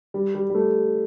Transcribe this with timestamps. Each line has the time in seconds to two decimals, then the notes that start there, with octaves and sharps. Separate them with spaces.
0.14 G3
0.35 G3
0.50 G3
0.55 A3